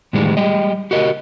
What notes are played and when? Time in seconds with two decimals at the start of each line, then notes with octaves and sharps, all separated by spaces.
0.13 A2 D#3 E3 G3 G#3
0.37 G3 G#3 G4 D#5
0.91 F#4 G4 A#4 D#5